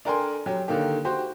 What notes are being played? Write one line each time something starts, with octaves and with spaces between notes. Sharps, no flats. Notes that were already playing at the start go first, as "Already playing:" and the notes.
D4 A4 A#4 G5 G#5 C6
F#3 G4
D3 D#3 A#3 G4
F#4 G4 C5